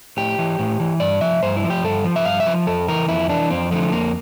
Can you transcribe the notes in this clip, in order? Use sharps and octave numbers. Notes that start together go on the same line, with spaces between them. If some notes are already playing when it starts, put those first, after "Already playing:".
A2 G4
E3
A2
E3
G2 D5
F3 E5
G2 C5
E4
F3
G4
G2 A4
F3
E5
G2 F5
E5
F3
F2 A4
E3 A#4
F2 E4
E3 D4
F2 C4
D3 F3 A3
F2 A#3